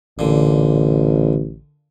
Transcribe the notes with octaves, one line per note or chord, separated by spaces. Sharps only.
A1 A#2 D3